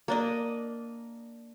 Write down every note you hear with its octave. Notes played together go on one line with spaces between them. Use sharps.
A#3 D4 D#5